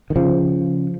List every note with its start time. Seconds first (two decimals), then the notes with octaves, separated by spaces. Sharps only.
0.10 D#3
0.16 C#3 F3